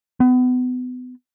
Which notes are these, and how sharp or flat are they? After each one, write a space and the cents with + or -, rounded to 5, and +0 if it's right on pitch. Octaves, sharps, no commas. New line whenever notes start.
B3 +30